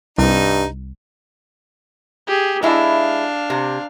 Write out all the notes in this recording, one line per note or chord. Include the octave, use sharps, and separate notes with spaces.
C2 G2 D#4
G4 G#4
G#3 D4 E4 F5
C3